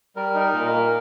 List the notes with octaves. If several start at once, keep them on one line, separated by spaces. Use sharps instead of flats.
G3 A#4
D#4
A#4
A#2
A#4
A#3